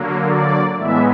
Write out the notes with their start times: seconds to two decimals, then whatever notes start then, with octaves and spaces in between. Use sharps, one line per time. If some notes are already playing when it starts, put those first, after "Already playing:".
Already playing: D3 F#3 A#3
0.19 D5
0.77 A2 E3 G#3 B3 E5